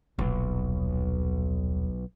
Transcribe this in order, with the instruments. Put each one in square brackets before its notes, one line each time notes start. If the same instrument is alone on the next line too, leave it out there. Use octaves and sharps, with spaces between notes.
[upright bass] D#1 [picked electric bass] B1